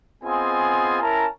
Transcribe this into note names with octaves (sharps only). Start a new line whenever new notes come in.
B3 C4 F4 G#4 D#5 G#5
C#4 E4 A#4 A5 A#5